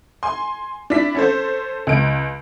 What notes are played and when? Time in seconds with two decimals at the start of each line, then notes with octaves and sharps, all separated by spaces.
0.23 G#5 C6
0.90 D4 E4 B6
1.15 C#4 A4 C5
1.87 C#2 D7